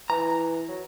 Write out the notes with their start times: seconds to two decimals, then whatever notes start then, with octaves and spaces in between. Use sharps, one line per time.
0.10 E3 A#5
0.69 F#3